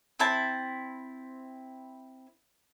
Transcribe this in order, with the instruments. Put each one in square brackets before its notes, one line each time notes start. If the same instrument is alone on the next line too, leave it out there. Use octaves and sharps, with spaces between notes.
[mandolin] C4 E4 A5